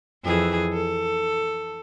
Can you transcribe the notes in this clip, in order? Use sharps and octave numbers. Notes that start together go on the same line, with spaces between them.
F2 E3 G#4
A4